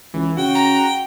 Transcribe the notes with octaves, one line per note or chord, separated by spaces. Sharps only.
C#2 E3
C#3 F#4 G5
A#5